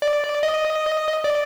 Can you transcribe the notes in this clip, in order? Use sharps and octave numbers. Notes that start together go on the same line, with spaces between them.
D5
D#5
D5